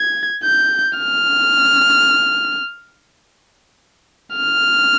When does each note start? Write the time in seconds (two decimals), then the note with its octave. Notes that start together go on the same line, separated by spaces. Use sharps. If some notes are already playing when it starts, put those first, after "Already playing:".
Already playing: G#6
0.43 G6
0.99 F6
4.36 F6